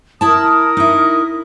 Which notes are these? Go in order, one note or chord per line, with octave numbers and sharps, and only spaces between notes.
E4 A#4 A5 D#6
D#4 E4